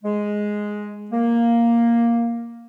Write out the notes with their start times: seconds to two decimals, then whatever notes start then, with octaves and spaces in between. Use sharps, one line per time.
0.04 G#3
1.12 A#3